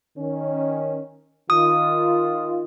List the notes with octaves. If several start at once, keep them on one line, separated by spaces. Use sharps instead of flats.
D#3 C#4
D#3 F4 D#6